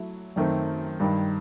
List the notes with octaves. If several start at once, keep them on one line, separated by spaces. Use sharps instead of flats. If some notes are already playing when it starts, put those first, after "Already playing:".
Already playing: F#3 A3 E4
F#2 D#3 A3 C4
G2 D#3 G3